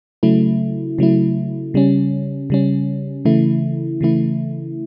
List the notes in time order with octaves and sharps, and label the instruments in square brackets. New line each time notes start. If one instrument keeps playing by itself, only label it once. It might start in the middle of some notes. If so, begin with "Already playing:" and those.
[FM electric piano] C#3 F#3 A3 E4
C#3 F#3 A3 E4
C#3 G3 C#4
C#3 G3 C#4
C#3 E3 A3 E4
C#3 E3 A3 E4